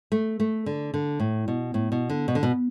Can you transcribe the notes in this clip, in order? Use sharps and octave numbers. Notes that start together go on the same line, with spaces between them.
A3
A3
D3
D3
A2
B2
A2
B2
D3
B2
D3
B2